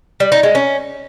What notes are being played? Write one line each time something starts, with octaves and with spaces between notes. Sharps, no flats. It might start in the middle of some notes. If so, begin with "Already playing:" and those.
G3
D#4
G#3
C#4